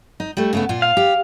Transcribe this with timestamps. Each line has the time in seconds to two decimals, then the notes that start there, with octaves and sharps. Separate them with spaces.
0.20 D#4
0.37 G3 A3
0.53 C#3 A3 B3
0.69 A#2 F4
0.82 F5
0.97 G4